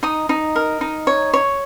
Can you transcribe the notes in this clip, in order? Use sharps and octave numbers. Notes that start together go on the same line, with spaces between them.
D#4 D#6
D#4
A#4
D#4
C#5
C#5